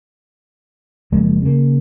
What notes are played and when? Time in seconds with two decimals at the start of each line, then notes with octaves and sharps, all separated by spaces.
1.12 F#1 F3 G#3 A#3
1.42 C#3 A#3